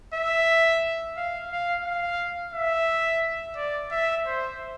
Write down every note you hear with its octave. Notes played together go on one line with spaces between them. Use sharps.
E5
F5
F5
F5
E5
D5
E5
C5